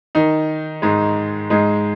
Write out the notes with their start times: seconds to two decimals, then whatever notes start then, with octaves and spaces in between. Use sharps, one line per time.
0.15 D#3 D#4
0.82 G#2 G#3
1.50 G#2 G#3